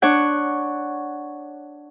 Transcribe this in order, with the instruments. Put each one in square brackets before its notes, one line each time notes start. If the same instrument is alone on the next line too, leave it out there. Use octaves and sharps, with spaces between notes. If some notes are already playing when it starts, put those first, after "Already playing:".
[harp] D4 C#5 F#5 F#6